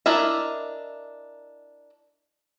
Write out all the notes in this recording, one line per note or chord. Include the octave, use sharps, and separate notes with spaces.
D4 E4 A#4 D#5 E5